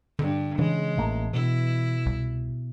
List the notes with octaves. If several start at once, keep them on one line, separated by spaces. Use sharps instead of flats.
G2 D3
C#3 E3 G#3
A1 A3 A#3
B2 E4
C2